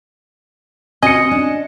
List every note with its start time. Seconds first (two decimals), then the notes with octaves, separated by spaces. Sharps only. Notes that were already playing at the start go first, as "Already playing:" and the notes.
1.03 C4 C#4 F#4 D#5 G#5 C#7
1.31 D4